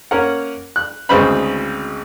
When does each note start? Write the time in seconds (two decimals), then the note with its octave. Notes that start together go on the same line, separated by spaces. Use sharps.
0.11 A#3 C#4 A#4 F#5
0.76 F#6
1.09 G#1 D2 C#3 B4 C5 B5